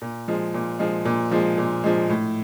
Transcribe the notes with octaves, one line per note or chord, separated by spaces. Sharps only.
A#2
F3 G#3
A#2
F3 G#3
A#2
F3 G#3
A#2
F3 G#3
A2